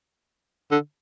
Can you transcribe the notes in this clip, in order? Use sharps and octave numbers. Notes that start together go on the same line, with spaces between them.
D3